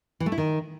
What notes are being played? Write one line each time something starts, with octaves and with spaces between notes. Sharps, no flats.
E3
A3
E4
D#3